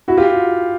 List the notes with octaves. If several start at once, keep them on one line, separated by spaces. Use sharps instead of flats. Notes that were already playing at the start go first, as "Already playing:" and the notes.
E4 F#4
F4 G4